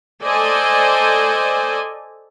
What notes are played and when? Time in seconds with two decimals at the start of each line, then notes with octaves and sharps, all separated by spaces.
0.24 A4 C5 D5 D#5 G#5